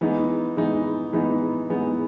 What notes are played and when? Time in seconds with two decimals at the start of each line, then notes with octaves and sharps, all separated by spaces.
0.01 E3 G#3 B3 D#4
0.57 E3 G#3 B3 D#4
1.13 E3 G#3 B3 D#4
1.70 E3 G#3 B3 D#4